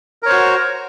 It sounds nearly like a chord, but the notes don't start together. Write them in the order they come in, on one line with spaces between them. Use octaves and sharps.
A#4 C#5 C5 F#4